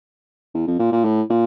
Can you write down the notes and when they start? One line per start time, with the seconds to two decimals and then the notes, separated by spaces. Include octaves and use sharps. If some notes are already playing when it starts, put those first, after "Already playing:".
0.54 E2
0.67 F2
0.79 A#2
0.92 A#2
1.05 A2
1.30 A#2